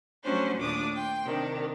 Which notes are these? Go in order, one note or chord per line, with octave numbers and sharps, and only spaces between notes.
F#3 G3 A3 C#4 D4 C5
D#2 A#2 A3 D4 D6 D#6
G5 C6
C3 D#3 D4